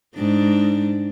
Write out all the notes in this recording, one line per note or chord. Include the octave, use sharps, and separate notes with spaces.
G#2 D4